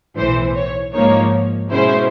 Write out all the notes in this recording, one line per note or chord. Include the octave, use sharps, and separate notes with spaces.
B1 A2 E3 C5
C#5
G#2 F3 A#3 D#4 C#5
B2 G#3 C#4 E4 C5